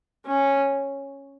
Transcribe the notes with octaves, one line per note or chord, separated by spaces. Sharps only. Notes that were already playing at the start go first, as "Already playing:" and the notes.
C#4